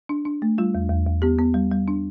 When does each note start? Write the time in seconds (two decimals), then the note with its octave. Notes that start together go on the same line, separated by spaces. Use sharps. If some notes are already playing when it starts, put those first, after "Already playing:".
0.09 D4
0.25 D4
0.42 A3
0.58 G3 F4
0.75 E2
0.90 E2
1.06 E2
1.22 B3 G4
1.39 B3
1.54 G3
1.71 G3
1.88 D4